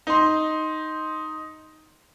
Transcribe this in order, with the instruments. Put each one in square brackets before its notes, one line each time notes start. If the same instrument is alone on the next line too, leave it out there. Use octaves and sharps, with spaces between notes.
[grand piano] D#4 C6